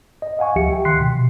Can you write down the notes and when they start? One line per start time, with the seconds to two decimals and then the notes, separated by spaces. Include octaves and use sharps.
0.22 D#5
0.39 F5 F#5 G#5 C#6
0.56 D2 F3 G4 E5 C#7
0.72 G5
0.85 D#3 C6 F#6 B6 C7
1.01 B2